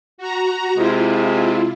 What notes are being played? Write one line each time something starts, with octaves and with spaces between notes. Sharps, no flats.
F#4 A#5
C3 G#3 E4 F4